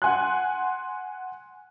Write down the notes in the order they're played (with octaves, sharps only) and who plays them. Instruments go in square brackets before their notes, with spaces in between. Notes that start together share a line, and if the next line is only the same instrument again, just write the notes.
[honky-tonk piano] F#5 G#5 C6 F#6